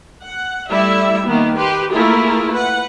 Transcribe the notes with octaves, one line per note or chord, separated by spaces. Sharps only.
F#5
G3 A3 E4 E5
D#3 A#3 B3
G4 B4 C6
A3 A#3 E4 F4 G#4 A#4
B4 F#5